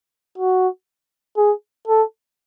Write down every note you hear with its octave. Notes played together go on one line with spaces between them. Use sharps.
F#4
G#4
A4